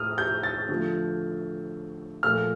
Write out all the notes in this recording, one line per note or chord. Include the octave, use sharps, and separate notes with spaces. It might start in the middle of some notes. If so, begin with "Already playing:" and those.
Already playing: A2 D#6 F6
G6
A6
D3 F3 A3
A#2 F3 A3 F6